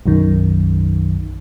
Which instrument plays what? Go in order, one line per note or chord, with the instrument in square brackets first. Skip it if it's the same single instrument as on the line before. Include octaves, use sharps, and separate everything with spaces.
[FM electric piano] B1 F#2 D#3